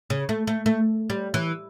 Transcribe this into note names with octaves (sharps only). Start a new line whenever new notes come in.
C#3
A3
A3
A3
G3
E3